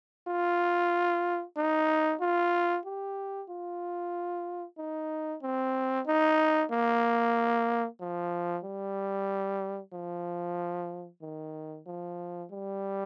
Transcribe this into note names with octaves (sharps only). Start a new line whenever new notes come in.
F4
D#4
F4
G4
F4
D#4
C4
D#4
A#3
F3
G3
F3
D#3
F3
G3